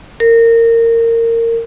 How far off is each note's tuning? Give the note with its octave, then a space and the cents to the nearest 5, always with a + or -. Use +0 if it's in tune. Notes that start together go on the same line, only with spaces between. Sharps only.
A#4 -20